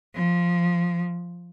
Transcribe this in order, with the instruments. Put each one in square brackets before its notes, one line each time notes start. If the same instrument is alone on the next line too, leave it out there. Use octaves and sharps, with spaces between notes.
[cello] F3